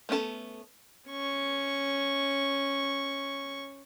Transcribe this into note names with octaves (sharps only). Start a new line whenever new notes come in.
A3 B3 C#4 F#4 A4
C#4 C#6